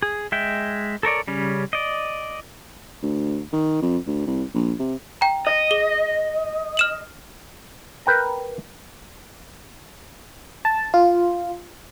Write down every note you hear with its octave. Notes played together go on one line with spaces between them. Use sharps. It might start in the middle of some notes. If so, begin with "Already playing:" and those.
G#4
G#3 E5 G5
A4 A#4 C#5 D5
C#3 G3 C#4
D5 D#5
D2
D#3
F2
D2
C2
A#1
C3
G5 A#5
D#5
G#4 G7
F6 E7 F#7
A#4 B4 G5 A#5
A5
F4